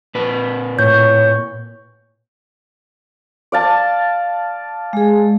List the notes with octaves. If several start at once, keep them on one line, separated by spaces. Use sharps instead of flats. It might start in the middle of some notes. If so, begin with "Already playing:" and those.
A#2 B4
A2 C#5 G6
D5 F5 A5
G#3 G#4